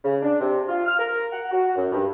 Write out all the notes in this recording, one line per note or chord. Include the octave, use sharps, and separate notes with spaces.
C#3
D4
C3
F4
F6
A#4
F#5
F#4
F#2
G2